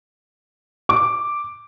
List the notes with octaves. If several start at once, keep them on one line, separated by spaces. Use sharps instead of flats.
D6